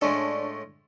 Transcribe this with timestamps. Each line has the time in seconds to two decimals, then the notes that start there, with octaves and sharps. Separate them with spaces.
0.01 A2 G#3 C#4 D4 F4 A4